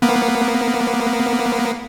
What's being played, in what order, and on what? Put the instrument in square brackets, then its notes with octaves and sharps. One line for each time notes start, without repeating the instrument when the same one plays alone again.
[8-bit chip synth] A#3 B3